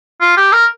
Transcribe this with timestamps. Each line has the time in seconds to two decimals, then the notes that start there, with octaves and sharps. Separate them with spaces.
0.21 F4
0.37 G4
0.53 A#4